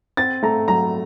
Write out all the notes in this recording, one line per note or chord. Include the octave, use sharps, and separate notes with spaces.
C4 A6
A3 A#5
F#3 A#5